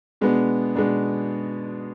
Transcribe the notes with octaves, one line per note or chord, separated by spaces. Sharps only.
B2 G#3 B3 D4
B2 G#3 B3 D4